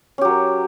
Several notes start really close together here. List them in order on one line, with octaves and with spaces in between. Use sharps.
C#4 G4 F#3 A#4